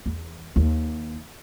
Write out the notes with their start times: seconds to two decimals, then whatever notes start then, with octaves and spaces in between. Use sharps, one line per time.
0.06 E2
0.56 D#2